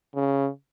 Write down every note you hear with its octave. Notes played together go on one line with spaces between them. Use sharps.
C#3